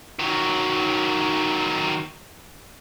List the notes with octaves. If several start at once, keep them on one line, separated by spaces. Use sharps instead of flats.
D#3 F#3